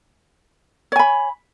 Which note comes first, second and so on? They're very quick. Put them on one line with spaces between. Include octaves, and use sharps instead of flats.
C#5 G#5 B5